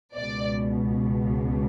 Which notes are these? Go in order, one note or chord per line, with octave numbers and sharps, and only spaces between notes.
C#2 B2 D5